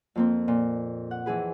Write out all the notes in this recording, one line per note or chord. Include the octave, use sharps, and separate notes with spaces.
F2 A#3 C4
A#2
F#5
F2 E3 G#4 B4